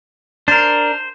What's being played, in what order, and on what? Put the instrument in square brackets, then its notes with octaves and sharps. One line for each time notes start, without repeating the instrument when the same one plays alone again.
[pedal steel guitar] D4 A#4 [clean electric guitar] C5